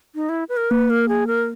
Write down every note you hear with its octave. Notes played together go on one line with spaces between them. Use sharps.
D#4
E4
B4
A#4
A#3 B4
A#4
G#4
A#4